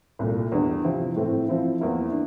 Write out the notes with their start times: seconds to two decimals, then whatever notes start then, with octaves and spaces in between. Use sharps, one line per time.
0.19 C2 A#2 A3
0.52 E2 D3 G3 D4
0.84 C3 F3 C4 E4
1.16 A2 E3 A3 C4
1.49 F3 C4 E4
1.81 E2 E3 A#3 E4 A#4
2.12 D4